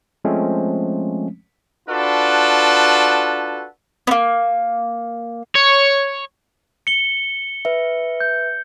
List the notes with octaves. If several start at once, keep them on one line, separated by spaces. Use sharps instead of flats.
F3 G#3 A3 C4 C#4
D4 F4 F#4 A4 B4
A#3 B3
C#5
C#7 G7
B4 E5
G6